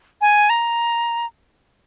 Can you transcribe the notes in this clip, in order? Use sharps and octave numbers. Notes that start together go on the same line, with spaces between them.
G#5
A#5